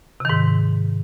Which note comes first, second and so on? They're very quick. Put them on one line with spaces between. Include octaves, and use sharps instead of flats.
C3 D#3 G#2